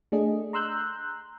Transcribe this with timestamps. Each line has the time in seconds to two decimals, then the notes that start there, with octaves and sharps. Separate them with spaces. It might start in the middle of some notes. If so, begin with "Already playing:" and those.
0.12 A3 D4 G#4 D#5
0.53 A#5 C6 E6 F#6 G6